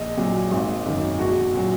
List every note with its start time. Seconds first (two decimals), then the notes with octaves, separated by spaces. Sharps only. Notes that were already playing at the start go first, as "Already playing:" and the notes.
Already playing: A#1 D#5
0.17 A#2 F#3
0.51 G#1
0.86 F#2 D#3
1.19 A#1 F#4
1.53 A#2 F#3